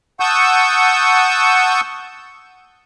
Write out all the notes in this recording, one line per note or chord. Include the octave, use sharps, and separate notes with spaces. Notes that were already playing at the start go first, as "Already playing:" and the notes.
F#5 A5 C#6 D#6 E6 G6